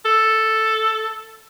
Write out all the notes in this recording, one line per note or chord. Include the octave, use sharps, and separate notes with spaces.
A4